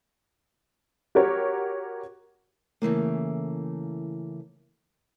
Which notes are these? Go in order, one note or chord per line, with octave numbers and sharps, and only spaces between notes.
F#4 G4 A#4 C#5
C#3 E3 A3 A#3